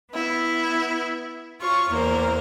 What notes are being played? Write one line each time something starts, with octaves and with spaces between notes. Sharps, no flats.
B3 E4
F4 C#5 C#6
E2 A#3 A#4 C5